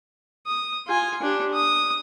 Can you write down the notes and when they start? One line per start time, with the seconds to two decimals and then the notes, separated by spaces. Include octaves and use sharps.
0.47 D#6
0.87 F4 G#5
1.22 D4 G4
1.53 D#6